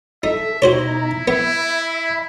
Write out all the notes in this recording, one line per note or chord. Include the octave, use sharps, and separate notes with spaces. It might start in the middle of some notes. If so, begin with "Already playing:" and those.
D#4 A4 E5
B2 D#4 E4 F#4 C5 C#5 A#5
B3 E4 E5 B5